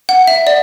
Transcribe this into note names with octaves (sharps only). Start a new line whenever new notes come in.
F#5
E5
D5